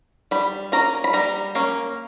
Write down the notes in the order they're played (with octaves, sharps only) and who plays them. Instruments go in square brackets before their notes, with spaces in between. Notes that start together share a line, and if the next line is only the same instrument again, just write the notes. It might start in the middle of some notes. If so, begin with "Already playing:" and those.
[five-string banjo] G3 B5
A#3 C#4 A#5
B5
G3 A#5
A#3 C#4